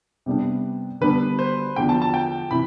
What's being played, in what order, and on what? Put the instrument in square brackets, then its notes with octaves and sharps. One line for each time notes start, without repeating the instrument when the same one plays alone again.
[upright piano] C3 G3 B3 D4 G4
[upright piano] D3 G3 B3 D4 [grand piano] B4
[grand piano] C5
[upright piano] E2 D3 F3 [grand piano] G5
[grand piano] A5
A5
G5
[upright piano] C3 E3 [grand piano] B5